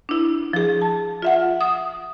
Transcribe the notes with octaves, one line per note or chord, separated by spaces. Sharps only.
D4 E4
F3 G#4
A5
F4 E5 F#5
D#6